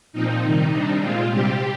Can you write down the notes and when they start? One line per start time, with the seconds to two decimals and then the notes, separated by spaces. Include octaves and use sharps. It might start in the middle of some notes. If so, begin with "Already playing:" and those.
0.13 A#2 F3 C4 D#4
0.43 C3 D#3 G3
0.72 C3 G3 D4
1.00 A#2 G#3 C4 F4
1.30 C3 G3 C4 G4